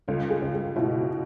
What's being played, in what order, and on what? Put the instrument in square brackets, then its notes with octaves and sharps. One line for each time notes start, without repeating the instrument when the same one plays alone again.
[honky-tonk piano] C#2 [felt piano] A4
[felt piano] G#4
[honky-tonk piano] C#2
[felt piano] G#4
[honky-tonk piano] B2 [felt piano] E4